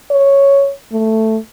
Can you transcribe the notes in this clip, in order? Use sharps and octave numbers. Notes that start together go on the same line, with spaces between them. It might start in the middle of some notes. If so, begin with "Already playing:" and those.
C#5
A3